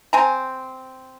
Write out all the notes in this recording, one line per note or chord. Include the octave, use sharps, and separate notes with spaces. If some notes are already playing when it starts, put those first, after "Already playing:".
C4 G#5 A#5